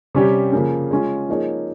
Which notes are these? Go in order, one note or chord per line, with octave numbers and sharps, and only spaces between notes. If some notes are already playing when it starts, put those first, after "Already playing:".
C3 G3 C#4 G4 C#5
C#3 F3 A#3 C#4
G#3 C#4 F4
F3 A#3 D#4 G#4 C#5